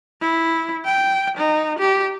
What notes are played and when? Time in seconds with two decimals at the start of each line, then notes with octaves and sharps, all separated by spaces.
0.21 E4
0.85 G5
1.38 D#4
1.79 G4